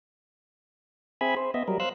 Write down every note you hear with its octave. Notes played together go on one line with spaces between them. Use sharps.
C4 G#4 E5 G#5 B5
C5
B3 D#5 E5
F#3 G3 A#4
C5 F5 E6 F#6